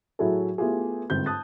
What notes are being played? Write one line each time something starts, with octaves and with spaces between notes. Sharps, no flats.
A2 F#3 E4 F#4 G#4 A4
A3 B3 E4 F4 G4 G#4
G1 G#2 C4 G6
A5 D#6 F#6 A6